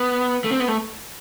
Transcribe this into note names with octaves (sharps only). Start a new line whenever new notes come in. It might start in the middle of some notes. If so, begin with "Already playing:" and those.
Already playing: B3
A3
C4
B3
A3